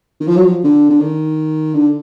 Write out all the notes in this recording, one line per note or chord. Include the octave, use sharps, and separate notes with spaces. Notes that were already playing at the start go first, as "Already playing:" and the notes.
D#3
F3
F#3
F3
D3
D3
D#3
D3